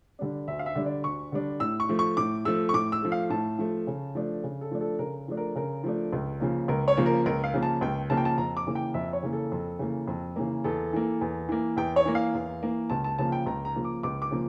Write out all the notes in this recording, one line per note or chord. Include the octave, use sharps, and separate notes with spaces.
D3 G3 D4
D2 E5
F5
E5
D3 G3 D4
D5
D2 C#6
D3 G3 D4
A2 E6
C#6
F3 A3
C#6
A2 D6
F3 A3 E6
C#6
A2 D6
E6
F3 A3
F5
A2 A5
F3 A3
C#3
F3 A3 D4
C#3
A4
F3 A3 D4
A4
C#3 A#4
F3 A3 D4
A#4
C#3 A#4
F3 A3 D4
C#2
C#3 F3 A#3
C#2 A#4
C#5
C#3 F3 A#3
A#4
C#2 A#4
F5
C#3 F3 A#3
A5
C#2 G5
C#3 F3 A#3 A5
G5
A5
F2 A#5
D6
C#3 E3 A#3
G5
F2 E5
C#5
C#3 E3 A#3
A4
F2
C#3 E3 A#3
F2
C#3 E3 A#3
E2 A4
E3 A#3
E2
E3 A#3
E2 G5
C#5
E3 A#3
F5
E2
E3 A#3
C#2 A5
A5
C#3 F3 A#3 A5
G5
C#2 A#5
A#5
C#3 F3 A#3
D6
C#2 D6
D6
C#3 F3 A#3